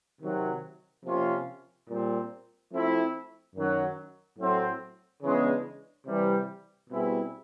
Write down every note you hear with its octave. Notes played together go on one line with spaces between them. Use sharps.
C3 D#3 F#3
C3 F3 A#3 C#4 F4
A#2 G3 C4
F3 A3 C4 E4
F#2 D#3 F#3
A2 F#3 A3 C4
C#3 E3 G#3 B3 D4
C3 E3 G3
B2 G3 C4 E4 G#4